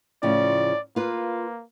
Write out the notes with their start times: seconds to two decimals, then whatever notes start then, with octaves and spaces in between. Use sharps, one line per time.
0.23 A2 C#3 F3 D5
0.96 A#3 F4 B4